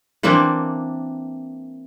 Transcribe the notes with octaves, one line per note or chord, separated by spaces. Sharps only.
E3 A#3 C4 D4